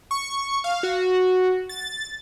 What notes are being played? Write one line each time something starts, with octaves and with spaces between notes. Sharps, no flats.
C#6
F5
F#4
A6